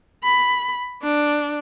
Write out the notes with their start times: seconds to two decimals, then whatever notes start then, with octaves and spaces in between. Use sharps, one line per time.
0.24 B5
1.03 D4